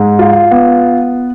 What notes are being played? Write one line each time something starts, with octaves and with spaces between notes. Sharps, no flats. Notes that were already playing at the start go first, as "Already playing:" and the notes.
Already playing: G#2
F4
B3